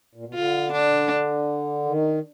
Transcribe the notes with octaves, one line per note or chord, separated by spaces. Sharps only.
A#2
B2
D3 F4
D4
D#3